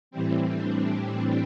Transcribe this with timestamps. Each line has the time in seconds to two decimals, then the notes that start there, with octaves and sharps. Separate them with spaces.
0.11 A2 E3 G3 C4
0.52 D4